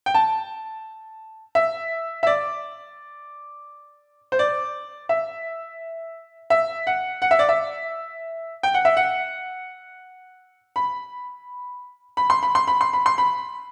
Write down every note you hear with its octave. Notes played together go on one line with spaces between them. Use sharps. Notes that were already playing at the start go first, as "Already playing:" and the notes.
G5
A5
E5
E5
D5
C5
D5
E5
E5
F#5
F#5
E5
D5
E5
G5
F#5
E5
F#5
B5
B5
C6
B5
C6
B5
C6
B5
C6
B5